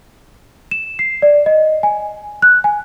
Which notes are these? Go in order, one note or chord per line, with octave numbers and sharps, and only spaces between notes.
E7
C7
D5
D#5
G#5
F#6
G#5